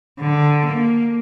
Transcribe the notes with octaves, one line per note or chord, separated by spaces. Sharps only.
D3
A#3